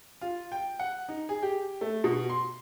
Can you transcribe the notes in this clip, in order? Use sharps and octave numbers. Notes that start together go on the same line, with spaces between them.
F4
G5
F#5
D#4
G#4
G4
A3
B2
C6